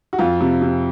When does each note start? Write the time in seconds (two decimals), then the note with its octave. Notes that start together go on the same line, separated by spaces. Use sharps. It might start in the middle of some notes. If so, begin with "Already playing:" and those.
0.13 F#4
0.18 F2 F4
0.41 C3
0.62 C3